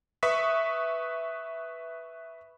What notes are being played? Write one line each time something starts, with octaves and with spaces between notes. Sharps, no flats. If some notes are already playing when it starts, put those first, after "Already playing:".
B4 E5 C#6 D#6 B6